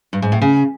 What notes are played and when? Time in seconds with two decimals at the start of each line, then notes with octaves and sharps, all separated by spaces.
0.13 G2
0.22 G#2
0.32 A2
0.41 C#3